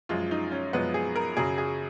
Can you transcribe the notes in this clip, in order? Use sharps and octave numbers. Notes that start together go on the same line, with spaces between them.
F#2 F3 G#3 F4
D#4
C#4
F#2 F3 G#3 B3
G#4
A#4
F#2 C#3 F#3 G#4
G#4